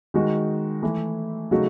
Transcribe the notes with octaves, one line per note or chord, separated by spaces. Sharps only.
D#3 G#3 D#4 F#4
E3 A3 E4
C#3 F#3 A3 D#4 F#4